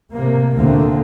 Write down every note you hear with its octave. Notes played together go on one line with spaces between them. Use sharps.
A2 C3 A#3
D2 A#2 D3 A3 A#3 C4